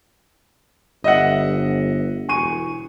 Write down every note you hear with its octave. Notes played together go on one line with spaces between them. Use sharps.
G1 D#5 E5 F#5
E1 G#5 C#6 D#7